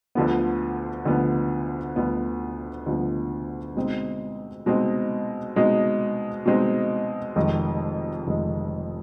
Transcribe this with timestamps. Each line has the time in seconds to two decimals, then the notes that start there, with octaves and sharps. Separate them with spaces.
0.15 D2 D3 F3 B3
1.05 D2 D3 F3 B3
1.96 D2 D3 F3 B3
2.86 D2 D3 F3 B3
3.75 B2 G#3 C4 D#4
4.66 B2 G#3 C4 D#4
5.56 B2 G#3 C4 D#4
6.46 B2 G#3 C4 D#4
7.36 F1 F2 D#3 G#3
8.27 F1 F2 D#3 G#3